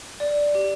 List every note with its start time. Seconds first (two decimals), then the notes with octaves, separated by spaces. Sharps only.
0.20 D5
0.55 G4